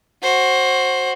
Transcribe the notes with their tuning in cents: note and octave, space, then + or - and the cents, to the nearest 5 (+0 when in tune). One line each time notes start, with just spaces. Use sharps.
F#4 +0 C5 +20